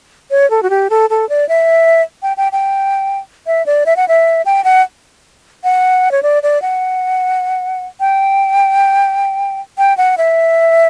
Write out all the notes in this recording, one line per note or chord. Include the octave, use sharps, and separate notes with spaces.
C#5
A4
F#4
G4
A4
A4
D5
E5
G5
G5
G5
E5
D5
E5
F#5
E5
G5
F#5
F#5
C#5
D5
D5
F#5
G5
G5
F#5
E5